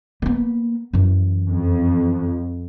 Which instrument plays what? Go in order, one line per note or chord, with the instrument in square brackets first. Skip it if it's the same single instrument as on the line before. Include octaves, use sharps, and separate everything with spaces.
[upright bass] A#3 B3
F#2 E3
[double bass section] F2